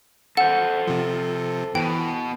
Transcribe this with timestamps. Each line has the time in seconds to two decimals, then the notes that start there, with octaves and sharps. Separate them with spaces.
0.37 A4 C5 F#5
0.87 C3 F3
1.75 B2 E3 G5